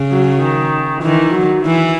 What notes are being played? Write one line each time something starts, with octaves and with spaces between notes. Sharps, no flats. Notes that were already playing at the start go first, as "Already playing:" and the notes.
Already playing: C#3
F#3
D#3
D#3 E3
F#3
E3 E4